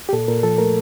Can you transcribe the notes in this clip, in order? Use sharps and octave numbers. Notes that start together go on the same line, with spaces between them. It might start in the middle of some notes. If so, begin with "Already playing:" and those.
G4
A#2 A4
A#2 A#4
F3 A4
A3 A#4